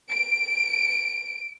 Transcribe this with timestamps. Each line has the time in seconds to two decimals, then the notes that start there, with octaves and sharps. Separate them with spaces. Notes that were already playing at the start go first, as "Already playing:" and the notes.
0.11 D7